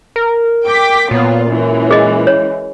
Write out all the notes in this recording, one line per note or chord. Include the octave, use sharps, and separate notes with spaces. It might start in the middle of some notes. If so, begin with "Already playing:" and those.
A#4
G5 D6 B6
A#2 F#3 B3 F4
F#2 E3 G#3
G#4 D#5
C#5